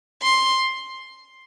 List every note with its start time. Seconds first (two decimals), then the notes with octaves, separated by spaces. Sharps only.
0.22 C6